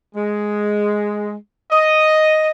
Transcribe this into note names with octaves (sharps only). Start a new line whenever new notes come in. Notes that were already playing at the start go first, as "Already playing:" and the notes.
G#3
D#5